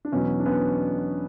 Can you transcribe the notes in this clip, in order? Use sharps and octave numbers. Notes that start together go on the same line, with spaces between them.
D4
E2 B2 F#3 B3 C#4
D4
B3 C#4